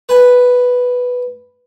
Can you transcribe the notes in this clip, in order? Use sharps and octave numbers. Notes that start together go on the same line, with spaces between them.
B4 G#5